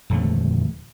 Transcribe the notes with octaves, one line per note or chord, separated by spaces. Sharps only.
D#1 F2 D3 A3